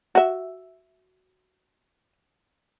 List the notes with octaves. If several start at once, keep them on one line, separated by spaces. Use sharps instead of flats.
F#4 E5